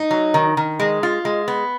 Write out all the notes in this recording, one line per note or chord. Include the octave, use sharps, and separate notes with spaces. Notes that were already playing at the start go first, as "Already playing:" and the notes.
Already playing: D#4
F#3
D#3
D#3
G#3
F4
G#3
B3